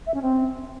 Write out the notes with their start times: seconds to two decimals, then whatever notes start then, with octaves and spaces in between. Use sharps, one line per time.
0.06 E5
0.14 C#4
0.22 C4